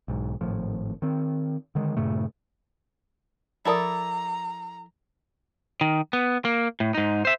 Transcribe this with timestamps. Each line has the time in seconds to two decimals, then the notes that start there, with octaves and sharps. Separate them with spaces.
0.08 B1 G#2
0.41 G#1 A2 F3
1.02 D#3 C4
1.75 D3 D#3 G#3
1.97 G2 A#2 C#3 A3
3.65 F3 E4 A4 A#4 D5 A#5 D#6
5.81 D#3
6.13 B3
6.45 A#3
6.80 A2
6.94 G#2 D#4
7.25 C5 E5